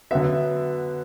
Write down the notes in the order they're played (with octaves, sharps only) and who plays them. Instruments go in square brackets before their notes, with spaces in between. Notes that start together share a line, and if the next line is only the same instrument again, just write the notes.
[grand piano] D3 F#3 B3 E5